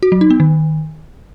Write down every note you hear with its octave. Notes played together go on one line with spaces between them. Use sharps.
F#4
F#3
D#4
B3
D#3